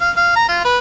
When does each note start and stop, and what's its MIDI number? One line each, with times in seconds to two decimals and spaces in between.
0.01 0.11 77
0.17 0.31 77
0.36 0.45 82
0.48 0.62 65
0.65 0.78 71